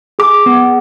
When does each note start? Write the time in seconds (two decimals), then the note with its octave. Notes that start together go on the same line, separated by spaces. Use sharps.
0.19 G#4 D6
0.46 B3